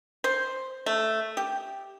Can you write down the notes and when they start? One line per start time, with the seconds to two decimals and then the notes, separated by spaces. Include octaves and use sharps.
0.24 C5
0.86 A3
1.37 G4